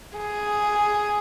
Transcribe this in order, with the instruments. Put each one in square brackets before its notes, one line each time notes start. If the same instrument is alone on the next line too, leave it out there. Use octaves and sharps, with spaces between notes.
[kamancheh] G#4